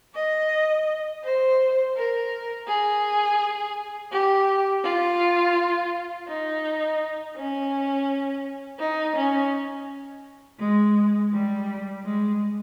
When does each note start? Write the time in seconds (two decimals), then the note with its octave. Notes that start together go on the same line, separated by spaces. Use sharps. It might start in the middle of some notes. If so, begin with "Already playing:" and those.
0.15 D#5
1.23 C5
1.95 A#4
2.67 G#4
4.11 G4
4.83 F4
6.27 D#4
7.35 C#4
8.79 D#4
9.16 C#4
10.59 G#3
11.32 G3
12.03 G#3